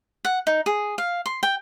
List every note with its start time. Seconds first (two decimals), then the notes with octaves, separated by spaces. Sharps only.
0.25 F#5
0.47 D#4
0.66 G#4
0.98 F5
1.26 C6
1.43 G5